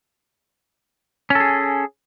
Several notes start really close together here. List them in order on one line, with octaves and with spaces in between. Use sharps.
C#4 A4 G#4